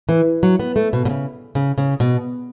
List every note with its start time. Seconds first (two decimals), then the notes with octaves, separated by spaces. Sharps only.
0.09 E3
0.43 F#3
0.60 B3
0.76 A3
0.93 B2
1.05 B2
1.09 C#3
1.55 C#3
1.78 C#3
2.00 B2